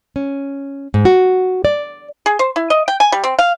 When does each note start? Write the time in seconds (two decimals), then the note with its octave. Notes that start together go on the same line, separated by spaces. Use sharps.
0.16 C#4
0.94 G#2
1.05 F#4
1.65 D5
2.26 G#4
2.39 C5
2.56 E4
2.70 D#5
2.88 G5
3.00 G#5
3.12 G3
3.24 C4
3.39 F5